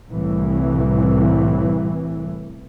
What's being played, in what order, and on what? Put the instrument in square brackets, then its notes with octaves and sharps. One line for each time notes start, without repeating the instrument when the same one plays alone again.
[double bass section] C2 A2 E3